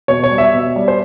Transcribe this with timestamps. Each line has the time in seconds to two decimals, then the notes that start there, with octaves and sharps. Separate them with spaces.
0.08 B2 C#5
0.24 C#5
0.31 G3
0.38 E5
0.54 B2
0.76 G3
0.88 C5